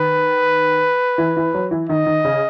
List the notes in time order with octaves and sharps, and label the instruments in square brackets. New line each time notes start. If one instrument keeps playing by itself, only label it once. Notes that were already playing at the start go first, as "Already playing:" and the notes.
Already playing: [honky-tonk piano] D#3 [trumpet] B4
[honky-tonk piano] E3
E3
F#3
E3
[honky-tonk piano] D#3 [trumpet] D#5
[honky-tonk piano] D#3
C#3